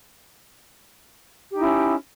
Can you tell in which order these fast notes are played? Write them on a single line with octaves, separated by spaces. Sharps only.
G4 D#4 E4 C#4